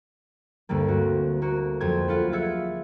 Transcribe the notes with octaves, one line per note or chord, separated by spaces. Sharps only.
D2 G2 D3 G3 A#3
C4 F#4
A#3 F#4
F2 F#3 G4 C5 G#6
F4 F#5 B5
F4 G#4 E5 F#5 G#6 C#7